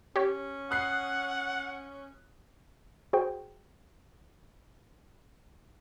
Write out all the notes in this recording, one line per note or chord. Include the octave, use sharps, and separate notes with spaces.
C#4 G4 C#5
F#5 D#6 F#6 C7
F#4 G#4 C5 G5